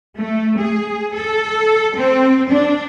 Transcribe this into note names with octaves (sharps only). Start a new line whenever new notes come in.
A3
G#4
A4
C4
D4